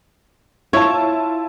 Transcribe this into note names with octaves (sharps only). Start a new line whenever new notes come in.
E4 F4 C#5 A5